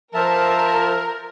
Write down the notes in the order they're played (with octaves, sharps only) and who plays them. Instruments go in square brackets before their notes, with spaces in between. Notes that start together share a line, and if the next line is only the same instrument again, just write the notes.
[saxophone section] F3 [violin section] A#4 [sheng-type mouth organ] E5 A5